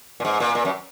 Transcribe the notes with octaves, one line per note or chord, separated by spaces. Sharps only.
A#2
G#2
A#2
A#2
F#2